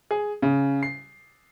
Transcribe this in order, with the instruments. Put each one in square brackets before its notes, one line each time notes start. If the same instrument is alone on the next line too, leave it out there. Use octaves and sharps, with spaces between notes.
[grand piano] G#4
C#3
C7